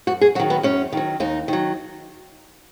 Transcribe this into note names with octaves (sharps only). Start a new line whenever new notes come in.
F#2 F#4
G#4
D#3 F#3 F#4
B3
F#2 C#4
D#3 F#3
D#2 D#4
D#3 F#3